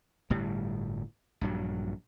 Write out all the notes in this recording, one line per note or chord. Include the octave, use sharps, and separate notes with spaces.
G1 A2 G3
A#1 G2 F#3